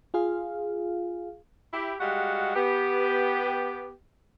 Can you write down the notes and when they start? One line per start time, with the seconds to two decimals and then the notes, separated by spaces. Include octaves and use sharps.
0.14 F4 G#4 F5
1.74 E4 G4
2.00 G3 G#3 F#4 F5 F#5
2.55 B3 G4